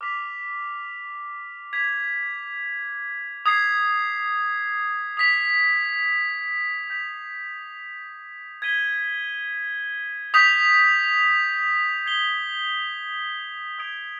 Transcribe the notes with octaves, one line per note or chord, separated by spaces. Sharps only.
D6 F6 B6 F7
G#6 B6 F7
D#6 G#6 C7
D#6 B6 F7
G6 B6 F7
G#6 B6 D#7 G7
D#6 G6 B6 F7
G#6 C7 G7
D#6 G#6 D7 F7